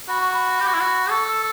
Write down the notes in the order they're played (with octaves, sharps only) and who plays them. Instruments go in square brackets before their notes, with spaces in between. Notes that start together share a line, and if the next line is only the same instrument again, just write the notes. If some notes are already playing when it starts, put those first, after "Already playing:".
[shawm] F#4 [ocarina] B5
[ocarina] C#6
B5
[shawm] G4
F#4
E4
F#4
[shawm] A4 [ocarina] C#6
[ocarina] E6